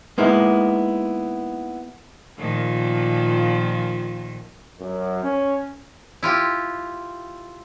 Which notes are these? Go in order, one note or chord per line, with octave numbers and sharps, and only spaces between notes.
G#3 A#3 B3 D#4 E4
A#2 D#3 F3
F#2
C#4
E4 F4 G4